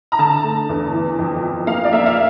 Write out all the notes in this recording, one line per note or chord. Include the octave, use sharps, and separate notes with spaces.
A#5
D3 A5
A3
E2
E3
F2
F2
A#3 F5
D5
A#3 E5
F5